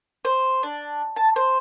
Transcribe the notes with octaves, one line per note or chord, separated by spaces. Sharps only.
C5
D4
A5
C5